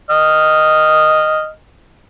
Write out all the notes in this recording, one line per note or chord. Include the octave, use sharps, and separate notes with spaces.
D#5 F6